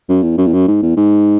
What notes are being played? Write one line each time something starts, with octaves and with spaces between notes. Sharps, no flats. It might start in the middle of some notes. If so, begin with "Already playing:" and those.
F#2
E2
F#2
E2
F#2
G#2
E2
G#2